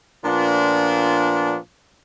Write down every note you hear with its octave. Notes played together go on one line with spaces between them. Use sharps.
A#2 F3 B3 D4